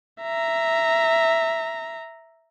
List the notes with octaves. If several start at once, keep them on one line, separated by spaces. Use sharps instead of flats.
E5 A#5